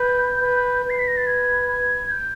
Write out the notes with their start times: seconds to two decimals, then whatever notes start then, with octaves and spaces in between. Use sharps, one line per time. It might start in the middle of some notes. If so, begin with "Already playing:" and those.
Already playing: B4 G6
0.42 B4
0.84 B4
0.90 C7
0.99 B6
1.07 A#6
1.17 A6
1.27 G#6
1.69 G#6
2.11 G6